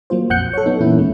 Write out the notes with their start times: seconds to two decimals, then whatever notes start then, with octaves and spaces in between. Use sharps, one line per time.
0.10 F#3 A#3 F4 C5
0.30 A#1 F2 F#5 F#6 G6 C#7
0.53 A4 C#5
0.66 F#3 B3 D#4
0.80 A#2 E3 A#3 C#4 E4
0.98 D#2 G#3